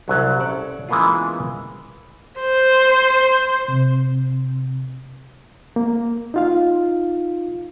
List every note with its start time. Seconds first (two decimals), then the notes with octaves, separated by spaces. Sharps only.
0.08 C2 F#3
0.40 C#4 A4 D5
0.89 E3 G#3 A#3 B3 C#4 F4
2.41 C5
3.68 C3
5.76 A#3
6.34 D#4 F4 F5